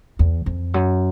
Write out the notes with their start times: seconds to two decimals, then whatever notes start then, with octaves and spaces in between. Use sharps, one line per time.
0.19 E2
0.46 F2
0.74 F#2